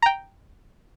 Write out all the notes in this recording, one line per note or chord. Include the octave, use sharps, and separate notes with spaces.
G5 A#5